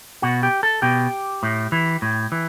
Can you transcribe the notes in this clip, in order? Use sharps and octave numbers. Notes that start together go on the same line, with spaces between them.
B2 F#4
G4
A4
B2 G4
A2
E3
A2
E3